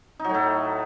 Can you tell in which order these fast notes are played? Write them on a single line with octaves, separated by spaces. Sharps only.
D#4 F#3 A2 A3